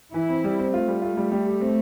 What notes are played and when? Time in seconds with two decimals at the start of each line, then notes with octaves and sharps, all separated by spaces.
0.14 E3 E4
0.29 C4
0.44 G3
0.59 C4
0.73 A3 F4
0.88 G3
1.02 F4
1.17 G3
1.32 G3
1.46 G4
1.61 C4